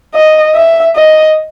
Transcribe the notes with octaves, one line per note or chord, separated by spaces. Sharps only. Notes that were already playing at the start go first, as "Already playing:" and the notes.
D#5
E5
D#5